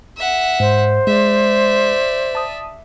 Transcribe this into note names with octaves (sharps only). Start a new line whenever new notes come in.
E5 F#5
G#2 C5
G#3 D5 E5
A5 D#6